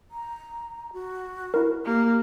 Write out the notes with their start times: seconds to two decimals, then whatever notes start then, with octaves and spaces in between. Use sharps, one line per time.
0.11 A#5
0.93 F#4
1.54 E4 A#4
1.85 A#3 G4